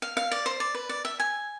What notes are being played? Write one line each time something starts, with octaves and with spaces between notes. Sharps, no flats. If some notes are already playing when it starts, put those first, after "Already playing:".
F5
F5
D5
C5
D5
B4
D5
E5
G#5